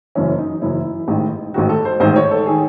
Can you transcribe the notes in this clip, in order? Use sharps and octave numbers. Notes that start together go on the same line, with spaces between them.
F#1 F#2 E3 C#4
D#4
F#1 F#2 E3 E4
A1 G#2 D#3
A1 G#2 D#3 F#4
A4
C5
A1 G#2 D#3 C5
C#5
A4
D#3 G#4